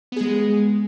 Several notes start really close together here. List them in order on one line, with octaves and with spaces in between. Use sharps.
B3 G#4 G#3